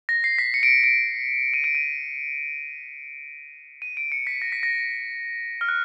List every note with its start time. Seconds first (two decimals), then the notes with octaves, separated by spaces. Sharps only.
0.09 A#6
0.24 C7
0.38 B6
0.54 C#7
0.63 D7
0.69 C#7
0.84 D7
1.54 D#7
1.64 D7
1.75 D#7
3.82 D#7
3.97 D7
4.12 C#7
4.27 B6
4.42 A#6
4.52 B6
4.63 A#6
5.61 F6
5.69 F#6